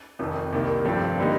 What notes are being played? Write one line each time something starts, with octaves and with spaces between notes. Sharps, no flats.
F1 F2 D#3
C2 C3 D#3 A#3
G2 F3 A3 C4 G4
D3 G3 A#3 D#4